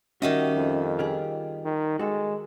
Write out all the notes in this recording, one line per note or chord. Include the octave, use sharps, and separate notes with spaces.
D#3 G3 C#4 F#4 D#5 E5
F2
F4 G4 G#4
D#3
G#3 F#4 A4